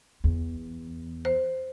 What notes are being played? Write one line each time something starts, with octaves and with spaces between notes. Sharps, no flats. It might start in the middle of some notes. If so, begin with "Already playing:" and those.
E2
C5